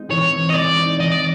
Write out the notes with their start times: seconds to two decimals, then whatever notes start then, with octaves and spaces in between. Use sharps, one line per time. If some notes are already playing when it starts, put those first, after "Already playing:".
Already playing: G#3 C4 D#4
0.11 E3 C#5
0.32 C4
0.50 D#5
0.55 G#3 D5
0.78 D#4
0.99 E3 D#5
1.11 D5